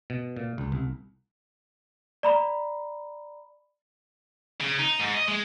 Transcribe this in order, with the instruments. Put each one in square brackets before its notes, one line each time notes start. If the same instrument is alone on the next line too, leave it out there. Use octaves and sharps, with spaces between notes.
[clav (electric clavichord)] B2
A#2
C#2
C2
[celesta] D5 A#5 B5
[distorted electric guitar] C#3
D#4
G#2
D#5
G#3